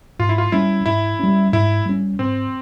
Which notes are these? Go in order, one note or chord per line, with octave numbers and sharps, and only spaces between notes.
G#2 F4
E4
F4
G3 C#4 E4
G#2 E4
G3 C#4
G#2 E4
G3 C#4
G#2 C4